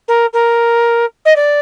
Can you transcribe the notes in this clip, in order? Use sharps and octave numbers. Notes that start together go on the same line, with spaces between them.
A#4
A#4
D#5
D5